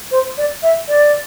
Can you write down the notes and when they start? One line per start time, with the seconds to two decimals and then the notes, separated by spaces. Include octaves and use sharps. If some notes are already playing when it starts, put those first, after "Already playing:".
0.11 C5
0.38 D5
0.63 E5
0.88 D5